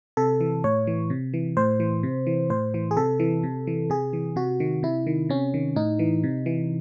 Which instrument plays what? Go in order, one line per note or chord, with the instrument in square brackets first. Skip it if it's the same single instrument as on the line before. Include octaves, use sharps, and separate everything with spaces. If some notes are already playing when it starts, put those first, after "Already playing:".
[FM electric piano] C3 A4
E3
A2 C#5
E3
C3
E3
A2 C5
E3
C3
E3
A2 C5
E3
G#4
C3 A4
E3
C3
E3
C3 G#4
E3
C3 F#4
D#3
C3 E4
D#3
C3 C#4
D#3
A2 D#4
E3
C3
E3